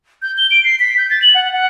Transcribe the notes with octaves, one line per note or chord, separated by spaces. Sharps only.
G6
G7
D7
C7
B6
G6
A6
F#7
F#5
F#5